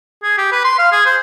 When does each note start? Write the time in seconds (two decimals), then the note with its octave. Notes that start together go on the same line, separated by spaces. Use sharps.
0.23 G#4
0.38 G4
0.52 B4
0.65 C6
0.79 F5
0.92 G#4
1.06 C5